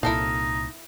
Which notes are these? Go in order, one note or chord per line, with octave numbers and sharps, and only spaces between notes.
C2 A#2 D#4 E4 A4 F5